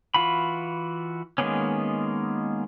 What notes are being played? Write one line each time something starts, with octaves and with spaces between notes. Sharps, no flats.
E3 F4 F#4 B5
D#3 G#3 A#3 B3 C#4